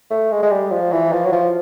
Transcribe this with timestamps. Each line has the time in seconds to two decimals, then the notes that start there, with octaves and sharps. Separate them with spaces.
0.11 A3
0.31 G#3
0.43 G#3
0.51 G3
0.71 F3
0.92 E3
1.13 F3
1.25 F#3
1.32 F3